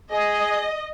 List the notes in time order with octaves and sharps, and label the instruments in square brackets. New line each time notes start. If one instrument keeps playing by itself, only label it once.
[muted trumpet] G#4 [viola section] D#5